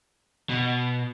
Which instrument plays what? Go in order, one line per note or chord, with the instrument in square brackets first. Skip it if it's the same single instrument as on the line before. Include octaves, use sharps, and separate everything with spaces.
[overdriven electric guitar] B2